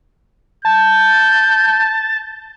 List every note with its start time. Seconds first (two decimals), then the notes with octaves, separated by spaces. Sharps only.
0.65 A5 G6